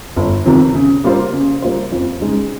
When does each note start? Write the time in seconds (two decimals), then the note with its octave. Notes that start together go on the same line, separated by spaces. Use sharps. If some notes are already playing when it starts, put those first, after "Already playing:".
0.16 G1
0.46 F2 C3 D#3
0.74 C#3
1.04 G3 A#3 F4 C5
1.33 C#3
1.62 G3 A#3 F4 C5
1.92 F2
2.21 C#3 G#3 D#4